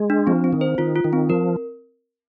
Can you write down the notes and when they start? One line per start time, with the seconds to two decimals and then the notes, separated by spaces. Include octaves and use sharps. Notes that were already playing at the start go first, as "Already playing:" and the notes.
Already playing: G#3
0.10 D4
0.27 F3 C4
0.44 C4
0.53 D#3
0.61 C5
0.78 D#3 F4
0.96 F4
1.04 D#3
1.13 C4
1.29 F3 A#4